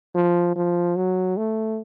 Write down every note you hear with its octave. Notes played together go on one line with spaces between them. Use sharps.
F3
F3
F#3
A3